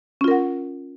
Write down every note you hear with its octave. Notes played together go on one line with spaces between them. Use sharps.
C#4 F4 A#4 F#5